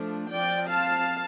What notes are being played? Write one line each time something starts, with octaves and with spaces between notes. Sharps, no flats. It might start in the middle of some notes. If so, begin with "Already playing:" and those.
Already playing: F3 A3 D4
F3 C4 D5 G5
F5 A5